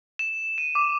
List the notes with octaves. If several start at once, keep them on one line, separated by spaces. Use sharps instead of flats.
E7
D#7
D6